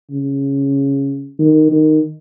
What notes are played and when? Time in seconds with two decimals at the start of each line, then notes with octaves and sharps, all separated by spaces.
0.10 C#3
1.39 D#3
1.72 D#3